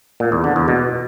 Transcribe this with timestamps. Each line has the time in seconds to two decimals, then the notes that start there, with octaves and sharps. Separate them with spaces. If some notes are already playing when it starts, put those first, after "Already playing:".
0.20 A#2
0.32 E2
0.44 D3
0.56 E2
0.68 B2